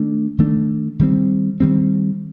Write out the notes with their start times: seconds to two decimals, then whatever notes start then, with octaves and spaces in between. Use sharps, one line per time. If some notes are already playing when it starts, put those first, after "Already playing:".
Already playing: D#3 A3 D4
0.38 D#3 A3 D4
0.99 D#3 G3 C4
1.60 D#3 G3 C4